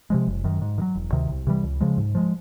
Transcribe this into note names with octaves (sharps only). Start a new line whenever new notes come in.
C3 F3 G#3
F#1
F#2 D#3
G#2
D#3
F#3
E1
D2 C3 D#3
C2
C3 E3 G3
C#2
C#3 F3 G#3
G#2
F3 G#3